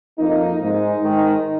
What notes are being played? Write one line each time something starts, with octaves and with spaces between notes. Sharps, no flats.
F2 F3 A#3 D#4
G#2 G#3 D#4
G#2 D#3 G#3